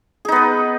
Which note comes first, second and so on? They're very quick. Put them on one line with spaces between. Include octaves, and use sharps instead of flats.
G#4 D#4 B3 B4